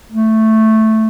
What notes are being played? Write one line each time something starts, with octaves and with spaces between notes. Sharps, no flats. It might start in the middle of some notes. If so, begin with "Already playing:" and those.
A3